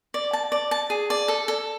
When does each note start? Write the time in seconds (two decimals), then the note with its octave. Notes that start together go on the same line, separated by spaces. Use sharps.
0.14 D5
0.33 A5
0.52 D5
0.71 A5
0.90 G#4
1.10 D5
1.28 A4
1.48 A4